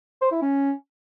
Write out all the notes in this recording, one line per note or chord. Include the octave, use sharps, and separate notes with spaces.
C5
E4
C#4